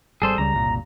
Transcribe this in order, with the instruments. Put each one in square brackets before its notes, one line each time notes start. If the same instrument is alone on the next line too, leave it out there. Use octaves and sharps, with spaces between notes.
[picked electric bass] G#1 G3 [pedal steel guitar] G#4 A4 C5
[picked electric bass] C#2 C#3 G3 [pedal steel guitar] A#5
[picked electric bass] F#1 C2 A#2